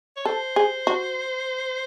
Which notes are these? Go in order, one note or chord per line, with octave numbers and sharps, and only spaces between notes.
C#5
A4 C5
G#4
F#4